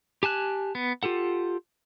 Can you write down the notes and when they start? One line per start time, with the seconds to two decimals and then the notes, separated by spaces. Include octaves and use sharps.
0.23 G4 G#5 A5 F#6
0.75 B3
1.03 F4 G4 A4 F#5